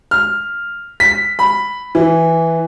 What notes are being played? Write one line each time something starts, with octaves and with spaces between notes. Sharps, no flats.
F6
B6
B5
E3